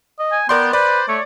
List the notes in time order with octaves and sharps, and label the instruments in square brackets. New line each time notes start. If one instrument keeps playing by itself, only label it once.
[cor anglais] D#5
[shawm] G#5
[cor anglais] B3 [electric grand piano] A#4 D5 C6 [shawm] G5
[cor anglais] B4 [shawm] C5 [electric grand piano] D5
[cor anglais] A3 [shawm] C#5